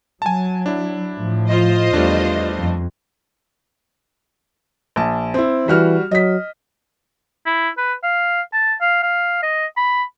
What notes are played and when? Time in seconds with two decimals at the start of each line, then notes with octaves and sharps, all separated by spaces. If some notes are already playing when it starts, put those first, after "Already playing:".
0.22 F#3 G#5 A5
0.66 D4 E4
1.15 A2 F3
1.47 F4 C5 D#5
1.93 E2 G3 A3 D4
2.55 F2
4.96 A#1 A5
5.34 C4 E4
5.68 E3 G3 F#4 F6
6.11 F#3 D#5 B6
7.46 E4
7.77 B4
8.03 F5
8.53 A5
8.81 F5
9.03 F5
9.43 D#5
9.77 B5